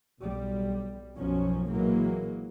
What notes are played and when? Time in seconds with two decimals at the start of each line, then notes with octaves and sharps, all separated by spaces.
0.20 B1 G3
1.15 B1 F#2 B2 F3 F#3 C#4
1.70 A#2 E3 F#3 G#3 A#3